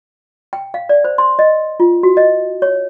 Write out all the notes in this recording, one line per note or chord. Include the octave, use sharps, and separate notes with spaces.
G5
F5
D5
C5
C6
D#5
F4
F#4
D#5
C#5